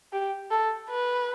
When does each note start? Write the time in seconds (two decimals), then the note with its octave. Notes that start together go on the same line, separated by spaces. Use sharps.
0.13 G4
0.51 A4
0.90 B4